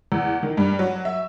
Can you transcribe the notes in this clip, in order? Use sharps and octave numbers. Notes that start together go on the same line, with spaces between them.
E2
D#3
G2
F#3
E5